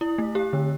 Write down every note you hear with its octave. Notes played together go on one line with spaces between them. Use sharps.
E4
A3
G4
D3